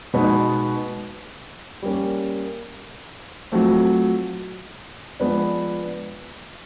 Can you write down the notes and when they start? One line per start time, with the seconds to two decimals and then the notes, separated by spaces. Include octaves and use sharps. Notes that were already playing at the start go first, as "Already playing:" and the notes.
0.14 B2 G#3 B3 D#4
1.82 G3 A#3 C#4
3.52 F#3 A3 C4 F4
5.20 F3 G#3 B3 D4